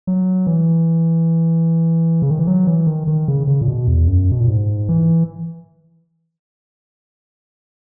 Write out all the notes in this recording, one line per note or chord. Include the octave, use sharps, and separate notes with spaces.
F#3
E3
C#3
D#3
E3
F#3
E3
D#3
D#3
C#3
C#3
A#2
B2
E2
F#2
B2
A#2
G#2
E3